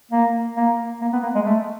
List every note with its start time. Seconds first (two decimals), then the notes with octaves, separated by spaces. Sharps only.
0.11 A#3
0.57 A#3
1.01 A#3
1.13 B3
1.23 A#3
1.35 G#3
1.46 A3